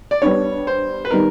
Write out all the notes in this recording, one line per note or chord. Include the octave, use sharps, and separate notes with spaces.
D5
G3 B3 D4 C#5
C5
B4
D#3 G3 B3 D#4 A#4